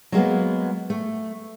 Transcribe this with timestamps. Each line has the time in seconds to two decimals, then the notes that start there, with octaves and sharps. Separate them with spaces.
0.12 F#3 G#3 A#3 B3
0.90 A3